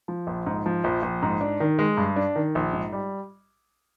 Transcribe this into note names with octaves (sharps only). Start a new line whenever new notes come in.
F3
A#1
G#2
F3
A#1
A#1
G#2
D4
D#3
G#3
G2
D4
D#3
A#1
G#2
G3